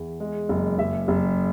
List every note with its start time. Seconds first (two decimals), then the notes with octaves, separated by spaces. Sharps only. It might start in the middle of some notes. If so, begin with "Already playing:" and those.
Already playing: E2
0.20 G#3
0.49 F#1
0.78 F#1 E5
1.08 F#1